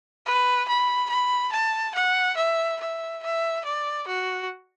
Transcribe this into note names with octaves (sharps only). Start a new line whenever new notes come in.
B4
B5
B5
A5
F#5
E5
E5
E5
D5
F#4